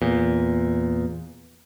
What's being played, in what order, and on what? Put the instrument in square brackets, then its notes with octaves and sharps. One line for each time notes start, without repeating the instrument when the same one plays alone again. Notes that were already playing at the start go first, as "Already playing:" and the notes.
[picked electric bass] E2 A#2